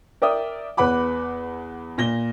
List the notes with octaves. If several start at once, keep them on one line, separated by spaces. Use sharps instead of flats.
A#4 D5 E5 G5 D#6
E2 B4 F#5 B5 D6
A#2 A#6 G7